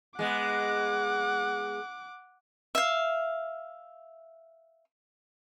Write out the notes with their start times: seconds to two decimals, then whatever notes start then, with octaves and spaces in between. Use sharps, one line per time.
0.19 G#3 B3 F#5 D6
2.75 E5 F5